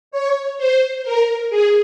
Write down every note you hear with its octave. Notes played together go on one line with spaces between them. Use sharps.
C#5
C5
A#4
G#4